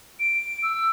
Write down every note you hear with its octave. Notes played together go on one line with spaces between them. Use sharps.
D7
E6